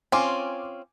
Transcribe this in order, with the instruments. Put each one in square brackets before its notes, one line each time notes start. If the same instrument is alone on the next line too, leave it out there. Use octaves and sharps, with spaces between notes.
[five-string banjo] C4 C#4 F4 [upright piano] G#5 D6